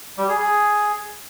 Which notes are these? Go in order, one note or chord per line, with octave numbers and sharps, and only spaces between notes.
G3
G#4
G#4